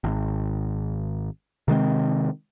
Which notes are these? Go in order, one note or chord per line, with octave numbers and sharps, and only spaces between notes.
G#1
C3 D#3 G#3 C4